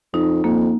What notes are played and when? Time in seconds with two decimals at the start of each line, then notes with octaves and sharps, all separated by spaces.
0.14 F2 D#4
0.44 F2 A#3